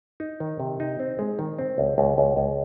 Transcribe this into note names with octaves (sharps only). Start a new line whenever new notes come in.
D#4
D#3
C3
D#4
C4
G#3
D#3
C4
C#2
C#2
C#2
C#2